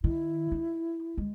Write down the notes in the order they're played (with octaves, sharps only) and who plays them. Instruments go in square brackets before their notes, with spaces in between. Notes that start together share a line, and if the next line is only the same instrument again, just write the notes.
[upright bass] D#3 [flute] E4
[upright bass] D#4
G#3